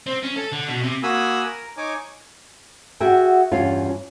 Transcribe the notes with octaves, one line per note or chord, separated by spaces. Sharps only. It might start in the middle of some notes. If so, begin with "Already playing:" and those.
C4
C#4
A4
D3
B2
C3
A#3 F#4 G#5 B5 D#6 E6
A#4
D#4 C#5 G#5 D6
F#4 G#4 E5 F#5 G5
E2 G2 C#4 F4 F5